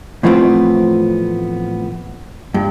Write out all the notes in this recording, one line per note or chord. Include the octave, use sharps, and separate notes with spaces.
A2 E3 F3 A3 B3 C4
G2